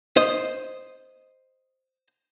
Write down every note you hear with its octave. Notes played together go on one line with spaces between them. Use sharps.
C5 D#5